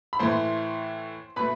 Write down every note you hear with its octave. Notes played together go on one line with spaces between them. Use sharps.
B5
A2 E3 A3 C5 C6
B2 A3 B4 B5